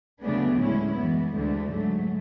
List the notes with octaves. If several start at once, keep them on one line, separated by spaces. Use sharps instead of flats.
D2 C#3 F#3 A3 B3 D4
A2 G#3 C#4 E4
F#2 E3 G#3 B3
D2 D3 G#3 A3
G#2 F#3 A3